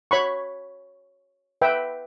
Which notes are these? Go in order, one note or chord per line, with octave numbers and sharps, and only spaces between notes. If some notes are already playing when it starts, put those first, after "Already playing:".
C#5 B5 C#6
B4 E5 G5